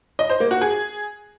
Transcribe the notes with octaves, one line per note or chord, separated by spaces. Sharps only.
D#5
C5
A#3
F#4
G#4